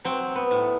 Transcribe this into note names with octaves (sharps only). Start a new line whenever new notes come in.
F#3 C4
B3
A2